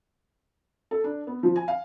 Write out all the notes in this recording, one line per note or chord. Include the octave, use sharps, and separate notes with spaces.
A4
D4
B3
F3
G#5
F5